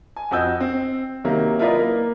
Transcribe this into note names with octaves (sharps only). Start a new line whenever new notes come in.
G#5
F2 F#4 D#5 E6 G6
C4
C3 D#3 F#3 A#3
E4 F4 A#4 B4 D5 D#5
A#3